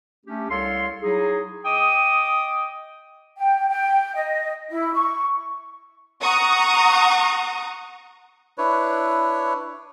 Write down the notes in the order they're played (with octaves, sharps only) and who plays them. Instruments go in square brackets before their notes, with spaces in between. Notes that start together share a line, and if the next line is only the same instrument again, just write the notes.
[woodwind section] A3 C#4 D4 G4
C2 A4 C#5 F5 C6
F#3 D#4 E4 G#4
D#5 G5 D6 D#6
[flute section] G5
G5
D#5
E4
C#6
[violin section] F#5 A#5 C#6 D#6
[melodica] D4 E4 B4 C#5